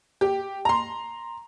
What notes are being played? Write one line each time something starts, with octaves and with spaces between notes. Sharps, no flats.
G4
A#5 C6